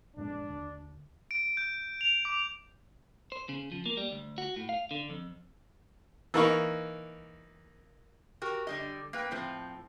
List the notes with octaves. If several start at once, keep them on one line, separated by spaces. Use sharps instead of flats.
A1 F2 G#3 D4
D#2 D3
D7
G6
F7
D6
C5
C#3
F3
A#3
G3
D2
F#4
A2
F5
D3
F2
E3 A#3 D#4 C#6
F#4 G4 A#4
D3 G3 D#5
A#3 B4 G5
A2 F3 C4